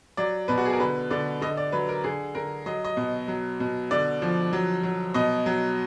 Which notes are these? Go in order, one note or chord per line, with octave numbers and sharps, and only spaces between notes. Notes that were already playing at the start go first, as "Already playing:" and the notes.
F#3 D5
B2 B4
F#4
G#4
A#4
D3 B4
D3 D5
D3 D#5
D5
F#3 B4
A#4
D3 G#4
D3 A#4
F#3 D#5
D#5
B2
F#3
B2
D3 D5
F3
F#3
F#3
B2 D#5
F#3